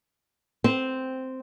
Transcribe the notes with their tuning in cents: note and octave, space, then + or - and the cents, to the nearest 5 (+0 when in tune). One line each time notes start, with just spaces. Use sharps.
C4 -5